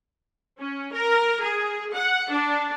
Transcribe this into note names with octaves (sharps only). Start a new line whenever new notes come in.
C#4
A#4
G#4
F#5
D4